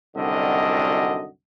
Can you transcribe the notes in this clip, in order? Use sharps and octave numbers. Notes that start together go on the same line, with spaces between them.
C2 F#2 D3 D#3 F#4 D#5